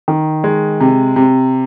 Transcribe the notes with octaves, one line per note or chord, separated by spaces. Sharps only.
D#3
G#3
C3
C3